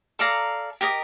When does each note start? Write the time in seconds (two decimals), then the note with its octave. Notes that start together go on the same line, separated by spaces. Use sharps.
0.19 A4 D5 F5 A#5
0.81 G4 A#4 D#5